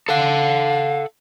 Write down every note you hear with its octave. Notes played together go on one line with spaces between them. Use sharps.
A4 F5 F#5